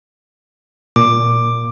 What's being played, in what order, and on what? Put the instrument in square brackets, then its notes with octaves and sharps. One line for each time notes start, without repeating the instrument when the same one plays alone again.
[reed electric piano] A#2 [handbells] D6